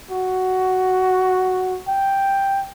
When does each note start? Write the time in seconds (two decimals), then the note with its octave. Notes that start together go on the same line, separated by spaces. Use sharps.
0.11 F#4
1.88 G5